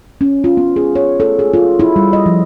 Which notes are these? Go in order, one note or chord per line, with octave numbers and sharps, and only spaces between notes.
C#4
F4
B3
G#4
C#5
A4
G#4
F4
E4
G3
D#5
F3